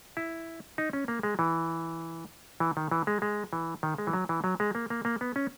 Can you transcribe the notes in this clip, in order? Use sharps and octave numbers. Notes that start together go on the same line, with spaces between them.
E4
D#4
C#4
A#3
G#3
E3
E3
D#3
E3
G#3
G#3
E3
D#3
G#3
E3
F#3
E3
F#3
G#3
A#3
A#3
A#3
B3
C#4